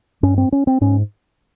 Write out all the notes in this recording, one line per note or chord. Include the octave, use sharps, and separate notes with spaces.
G2 C#4
C4
C#4
C4
G#2 C#4